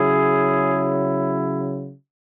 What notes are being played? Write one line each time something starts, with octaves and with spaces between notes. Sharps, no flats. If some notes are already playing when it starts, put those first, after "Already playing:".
Already playing: C#3 F#3 E4 G#4